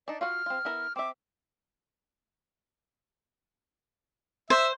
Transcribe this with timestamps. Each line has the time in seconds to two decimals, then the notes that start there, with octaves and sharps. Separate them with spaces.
0.08 D4 D#4 D5
0.21 F4 F#4 F#5 F6
0.46 C4 F4
0.65 B3 E4 A#4
0.96 C4 E5 D6
4.50 C5 E5